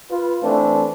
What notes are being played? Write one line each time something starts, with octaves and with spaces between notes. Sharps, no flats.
F4 B4
E3 A3 C4 D4